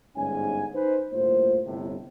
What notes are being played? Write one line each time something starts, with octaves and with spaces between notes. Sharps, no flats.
G1 G#2 C#4 G#5
D#4 B4 C5
G1 A2 A#3 F4 C5
G1 A2 C3